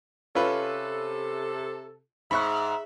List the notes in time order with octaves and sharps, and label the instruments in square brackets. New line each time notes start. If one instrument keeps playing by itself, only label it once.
[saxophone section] C3 A4 [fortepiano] C#4 F4 B4
[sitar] G#2 [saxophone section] E5 [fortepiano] B5 C#6 F#6